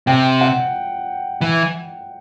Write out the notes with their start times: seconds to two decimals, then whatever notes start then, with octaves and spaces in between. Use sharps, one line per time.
0.07 C3 G5
0.41 F#5
1.41 E3